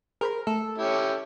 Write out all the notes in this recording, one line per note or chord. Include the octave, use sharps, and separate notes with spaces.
G#4 A#4 C5 B5
A3 A4
C#4 E4 G4